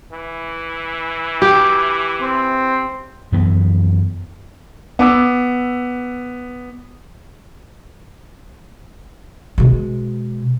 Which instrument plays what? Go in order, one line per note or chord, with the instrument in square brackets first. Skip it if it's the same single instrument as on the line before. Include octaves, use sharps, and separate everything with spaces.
[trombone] E3
[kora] G4
[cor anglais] C4
[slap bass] F#2 E3 B3
[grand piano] B3 D6 E6
[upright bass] B2 G#3